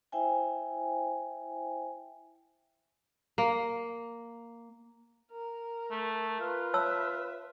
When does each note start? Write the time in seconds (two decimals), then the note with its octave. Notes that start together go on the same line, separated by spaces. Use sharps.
0.12 E4 C5 E5 G5 G#5
3.38 A#3
5.32 A#4
5.91 A3
6.41 F4 B4
6.74 C#5 E5 A5 E6